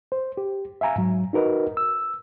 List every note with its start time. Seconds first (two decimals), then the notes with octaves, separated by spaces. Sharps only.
0.12 C5
0.37 G4
0.81 E5 F5 G#5 A#5
0.96 G#2 F#3
1.33 D#4 F#4 A#4 B4 D#5
1.77 E6